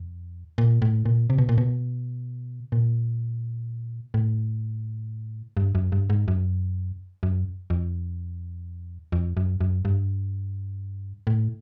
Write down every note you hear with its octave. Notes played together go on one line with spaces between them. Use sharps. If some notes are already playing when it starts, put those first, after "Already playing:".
Already playing: F2
A#2
A2
A#2
C3
B2
A#2
B2
A#2
A2
G2
F#2
G2
G#2
F#2
F#2
F2
F2
F#2
F#2
G2
A2